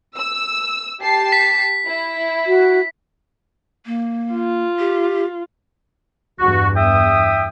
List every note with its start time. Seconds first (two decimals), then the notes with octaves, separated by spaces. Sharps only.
0.16 E6
1.01 G4 A5 C7
1.32 B6
1.87 E4
2.47 F#4
3.86 A#3
4.33 F4
4.79 G4
6.39 E2 G2 F#4
6.76 E5 G5 D#6